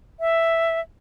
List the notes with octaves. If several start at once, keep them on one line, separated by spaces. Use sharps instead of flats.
E5